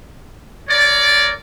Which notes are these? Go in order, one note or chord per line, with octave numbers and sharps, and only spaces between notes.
A#4 C#5 D5